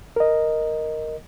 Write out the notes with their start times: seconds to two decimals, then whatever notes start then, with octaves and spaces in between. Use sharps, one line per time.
0.16 A#4 D#5